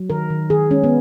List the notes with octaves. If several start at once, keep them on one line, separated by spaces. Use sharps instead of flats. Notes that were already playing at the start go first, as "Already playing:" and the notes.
Already playing: F#3
D#3 A#4
D#3
D#3 G#4
G#3 C#4
B3